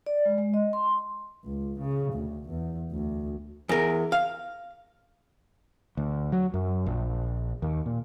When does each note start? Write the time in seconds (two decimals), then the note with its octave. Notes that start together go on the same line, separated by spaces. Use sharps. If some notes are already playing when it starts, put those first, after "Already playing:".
0.06 D5
0.25 G#3
0.38 G#3
0.54 D#5
0.73 C6
1.45 C#2
1.80 C#3
2.13 D2
2.49 E2
2.91 D2
3.69 E2 A#4
4.12 F5
5.97 D2
6.32 F#3
6.54 F#2
6.86 A#1
7.62 D#2
7.86 A#2